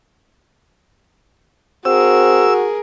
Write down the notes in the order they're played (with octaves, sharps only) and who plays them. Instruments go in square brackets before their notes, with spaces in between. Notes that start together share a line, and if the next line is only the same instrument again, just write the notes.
[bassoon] C4 [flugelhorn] F#4 [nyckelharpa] G#4 A#4 [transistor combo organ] E6